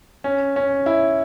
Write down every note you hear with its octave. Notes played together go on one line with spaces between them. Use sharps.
C#4
C#4
E4